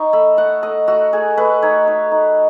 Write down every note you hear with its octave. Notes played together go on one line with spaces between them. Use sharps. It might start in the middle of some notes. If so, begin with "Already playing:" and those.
Already playing: D#4 C#6
A3 B5
A3 F#5
A3 D#5
A3 F#4
A3 G#4
A3 B4
D#4 C#5
D#4
D#4